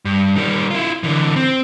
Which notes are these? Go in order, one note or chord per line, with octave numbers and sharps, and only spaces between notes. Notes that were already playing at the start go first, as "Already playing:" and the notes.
G2
D#3 G3
E4 F4
D3 E3
C4